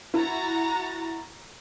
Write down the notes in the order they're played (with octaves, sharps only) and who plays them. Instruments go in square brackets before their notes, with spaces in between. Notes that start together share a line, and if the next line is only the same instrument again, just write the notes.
[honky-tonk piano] E4 [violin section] F#4 A#5 A6